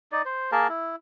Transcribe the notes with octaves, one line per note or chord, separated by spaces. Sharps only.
D#4 D5
C5
A#3 G#4 A#4 A5
E4